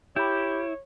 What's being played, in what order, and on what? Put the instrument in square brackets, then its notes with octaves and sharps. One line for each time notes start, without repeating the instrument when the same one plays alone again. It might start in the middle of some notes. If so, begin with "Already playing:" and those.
[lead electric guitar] E4 [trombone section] G4 [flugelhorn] C#5 [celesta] B5 G6